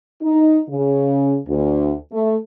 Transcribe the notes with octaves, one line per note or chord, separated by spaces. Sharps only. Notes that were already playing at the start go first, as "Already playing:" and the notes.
D#4
C#3
D2
A3